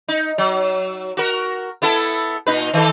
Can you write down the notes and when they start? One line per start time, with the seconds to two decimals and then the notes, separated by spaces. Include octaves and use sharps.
0.08 D#4
0.38 F#3
1.17 F#4 A#4
1.82 B3 E4 A4
2.47 A#2 D#4 B4
2.74 D#3 A4